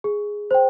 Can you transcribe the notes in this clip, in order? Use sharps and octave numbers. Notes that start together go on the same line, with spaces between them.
G#4
C5 G5